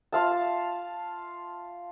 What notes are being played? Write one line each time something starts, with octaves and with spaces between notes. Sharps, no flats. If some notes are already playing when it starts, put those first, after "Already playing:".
F4 F5 A5